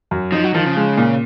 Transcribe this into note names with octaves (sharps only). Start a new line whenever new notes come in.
F#2
F3 D#4
F#3
D#3 F3
C#3
G#3
A#2